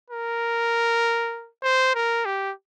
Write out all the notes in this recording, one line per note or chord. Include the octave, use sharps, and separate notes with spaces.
A#4
C5
A#4
G4